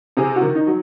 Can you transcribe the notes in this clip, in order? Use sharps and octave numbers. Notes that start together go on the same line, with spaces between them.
C3 G#4
F#4
D#3
D#4
F#3